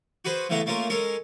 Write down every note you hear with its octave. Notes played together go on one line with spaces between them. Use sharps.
F#4 G#4 B4 C5
C#3 E3 A3 B3 A5 A#5
A3 A#3 C#4 F4 A#4
G#3 C#4 A4 A#4 C#5